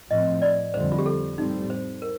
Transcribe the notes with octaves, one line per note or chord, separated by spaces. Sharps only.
A2 F3 C4 D#5
D5
F2 D3 G3 C4 C5
F4
G4
A4
A2 G3 C4 D#4
C5
A#4